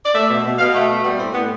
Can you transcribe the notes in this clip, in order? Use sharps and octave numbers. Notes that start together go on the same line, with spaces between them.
D5
A3 E5
B2
B2
B2 F5
A3
B2
G3 B3
A2 C4
A2 B3